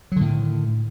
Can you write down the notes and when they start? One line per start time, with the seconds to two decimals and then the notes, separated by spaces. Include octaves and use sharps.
0.12 F#3
0.16 D3
0.21 A2
0.26 D#3